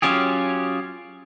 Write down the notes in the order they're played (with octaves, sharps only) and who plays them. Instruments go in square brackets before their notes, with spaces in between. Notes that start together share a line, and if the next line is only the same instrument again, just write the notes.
[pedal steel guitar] F#3 C#4 F4 G4 G#4